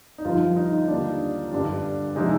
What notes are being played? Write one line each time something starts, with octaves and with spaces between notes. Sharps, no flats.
D#4
G1 G2 F3 F4
D#4
D#2 D3 G3 D4
G1 G2 D3 G3 D4
C3 F3 G#3 D#4